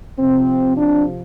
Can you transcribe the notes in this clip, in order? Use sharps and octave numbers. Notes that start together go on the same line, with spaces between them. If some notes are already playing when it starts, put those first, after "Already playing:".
C3 F3 C4
D4